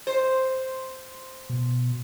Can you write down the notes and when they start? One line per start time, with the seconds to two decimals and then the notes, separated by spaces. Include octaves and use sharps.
0.07 C5
1.49 B2